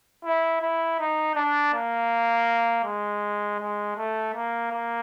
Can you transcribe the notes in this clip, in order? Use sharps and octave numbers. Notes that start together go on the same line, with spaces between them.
E4
E4
D#4
D4
A#3
G#3
G#3
A3
A#3
A#3